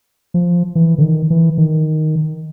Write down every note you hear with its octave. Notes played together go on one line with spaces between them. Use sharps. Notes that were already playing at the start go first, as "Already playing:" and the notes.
F3
E3
D3
D#3
E3
D#3